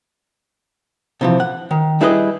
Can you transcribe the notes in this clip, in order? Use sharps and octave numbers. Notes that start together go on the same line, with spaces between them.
C3 E3 F3
F#5
D#3
G3 E4 G#4 B4 C#5 D#5